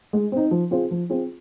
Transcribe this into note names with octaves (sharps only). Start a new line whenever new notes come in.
G#3
C4 D#4
F3
C4 F4 G#4 C5
F3
C4 F4 G#4 C5